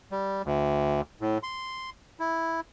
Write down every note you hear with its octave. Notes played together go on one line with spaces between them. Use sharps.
G3
D2
A2
C6
E4